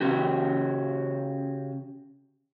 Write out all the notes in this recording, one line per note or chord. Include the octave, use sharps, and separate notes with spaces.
C#3 C#4 F#4 G4